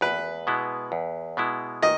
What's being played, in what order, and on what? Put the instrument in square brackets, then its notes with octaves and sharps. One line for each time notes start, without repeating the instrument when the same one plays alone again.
[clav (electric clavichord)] E2 [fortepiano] B4
[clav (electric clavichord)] B2 G#3 B3 E4
E2
B2 G#3 B3 E4
[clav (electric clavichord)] D#3 [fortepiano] D#5